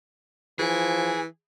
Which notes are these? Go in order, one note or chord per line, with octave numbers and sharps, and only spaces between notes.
E3 F3 G#4